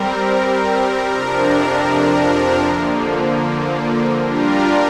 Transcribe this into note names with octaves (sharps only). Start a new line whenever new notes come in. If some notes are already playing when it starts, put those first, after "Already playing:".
Already playing: G3 C4 A#4
F2 C3 F3 D4 A#4
D3 F3 A#3
G3 D4 F4 A#4